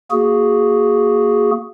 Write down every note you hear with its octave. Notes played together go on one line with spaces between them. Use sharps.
A#3 F#4 G#4